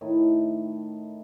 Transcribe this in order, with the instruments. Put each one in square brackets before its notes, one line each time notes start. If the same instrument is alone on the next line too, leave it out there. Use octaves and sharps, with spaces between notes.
[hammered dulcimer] A2 D#3